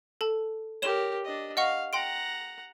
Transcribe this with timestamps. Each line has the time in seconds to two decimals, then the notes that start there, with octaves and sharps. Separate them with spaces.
0.21 A4 A5
0.82 G4 A#4 C#5 E7 G7
1.25 D4 D#5
1.57 D#5 F5 F#5 C#6
1.93 F#5 G5 A#5 C6 D7